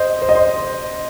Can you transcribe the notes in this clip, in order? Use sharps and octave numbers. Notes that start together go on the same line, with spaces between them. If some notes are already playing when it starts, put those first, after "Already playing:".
Already playing: C5 D#5
C5
D#5
C5